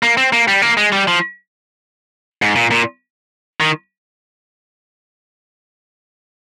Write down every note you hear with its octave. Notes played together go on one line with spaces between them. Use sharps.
A#3
C4
A#3
G3
A#3
G#3
G3
F3
G#2
A#2
A#2
D#3